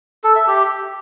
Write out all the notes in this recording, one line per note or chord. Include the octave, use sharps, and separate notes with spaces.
A4
E5
G4